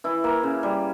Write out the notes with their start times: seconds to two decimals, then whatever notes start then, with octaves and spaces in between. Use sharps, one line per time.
0.04 E3 E4
0.24 A#3
0.43 C#3
0.63 G3